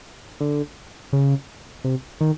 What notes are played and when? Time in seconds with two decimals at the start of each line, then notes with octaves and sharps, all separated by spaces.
0.40 D3
1.13 C#3
1.84 C3
2.21 D#3